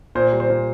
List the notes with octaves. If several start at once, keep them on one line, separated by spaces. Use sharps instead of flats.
A#2 C5
G3
C5
A#2